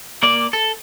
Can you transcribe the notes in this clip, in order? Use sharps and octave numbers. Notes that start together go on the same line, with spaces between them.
A#3 D5
A4